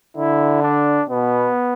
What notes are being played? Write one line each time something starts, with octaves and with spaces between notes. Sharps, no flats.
D3 E4
D4
B2 B3